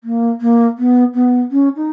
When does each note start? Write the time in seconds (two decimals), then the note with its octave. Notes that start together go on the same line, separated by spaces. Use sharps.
0.03 A#3
0.41 A#3
0.78 B3
1.14 B3
1.51 C#4
1.76 D#4